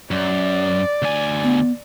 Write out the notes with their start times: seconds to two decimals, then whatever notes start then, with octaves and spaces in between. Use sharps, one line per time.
0.11 F#2 D5
1.02 D2 G#5
1.44 B3